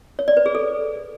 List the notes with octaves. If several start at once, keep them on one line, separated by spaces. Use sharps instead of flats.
C#5
D5
B4
G#4
A4